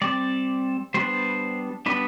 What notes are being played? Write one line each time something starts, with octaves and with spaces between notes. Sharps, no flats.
G3 C4 D5
G3 B3 D4 C5
G3 B3 D4 B4